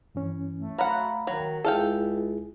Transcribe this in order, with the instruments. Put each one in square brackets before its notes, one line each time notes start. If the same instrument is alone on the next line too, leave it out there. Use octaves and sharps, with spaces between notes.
[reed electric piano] G2 E3 C#4
[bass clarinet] A3
[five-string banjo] F#3 F#5 [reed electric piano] F5 A#5 B5
[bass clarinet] D#3 [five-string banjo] F#3
[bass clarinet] C#2 [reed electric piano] E4 G#4 [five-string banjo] A4 F5 G5